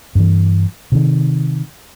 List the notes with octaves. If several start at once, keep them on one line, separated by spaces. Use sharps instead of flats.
G2 E3
C3 D#3